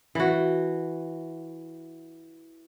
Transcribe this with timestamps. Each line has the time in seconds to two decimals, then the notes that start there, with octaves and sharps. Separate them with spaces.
0.15 E3 F#4